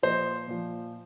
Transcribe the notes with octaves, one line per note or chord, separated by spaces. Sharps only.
A#2 F3 C5 D#5
A#2 F3